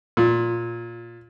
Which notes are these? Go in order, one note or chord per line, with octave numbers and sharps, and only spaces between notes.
A#2